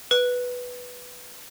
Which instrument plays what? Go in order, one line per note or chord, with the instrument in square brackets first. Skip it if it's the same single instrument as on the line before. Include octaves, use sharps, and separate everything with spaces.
[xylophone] B4